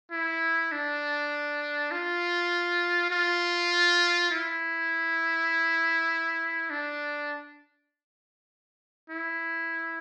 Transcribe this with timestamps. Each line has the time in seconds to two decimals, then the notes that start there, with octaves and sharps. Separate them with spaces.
0.12 E4
0.72 D4
1.91 F4
3.11 F4
4.31 E4
6.70 D4
9.10 E4